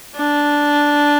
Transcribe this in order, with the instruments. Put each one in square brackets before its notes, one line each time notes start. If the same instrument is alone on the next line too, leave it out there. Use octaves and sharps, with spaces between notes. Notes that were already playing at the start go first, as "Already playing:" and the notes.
[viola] D4